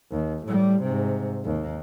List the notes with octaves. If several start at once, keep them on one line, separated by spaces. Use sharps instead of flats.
D#2
A2 G3
G#2 C3
D#2